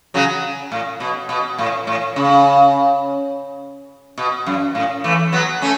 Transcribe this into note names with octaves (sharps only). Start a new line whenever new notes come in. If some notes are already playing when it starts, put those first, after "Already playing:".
C#3 F#3
A2
B2
B2
A2
A2
C#3
B2
F#2
A2
E3 A3
F#3 B3
A3 C#4